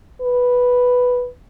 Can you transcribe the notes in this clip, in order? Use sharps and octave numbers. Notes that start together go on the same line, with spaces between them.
B4